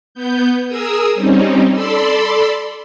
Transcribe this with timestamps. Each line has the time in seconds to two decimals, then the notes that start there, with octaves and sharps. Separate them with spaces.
0.14 B3 G6
0.68 G#4 A#4 D#6 E6
1.15 G3 C4 C#4 D#4
1.72 A4 D5 B5 C6 E6